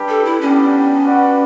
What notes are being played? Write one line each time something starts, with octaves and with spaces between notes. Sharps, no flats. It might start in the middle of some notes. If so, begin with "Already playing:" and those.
Already playing: G3 D4 G4 B4
A4
E4
G3 B3 C#4 D4 G4
F#4 B4 D5 F#5